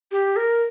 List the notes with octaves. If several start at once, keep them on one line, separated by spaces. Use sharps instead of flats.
G4
A#4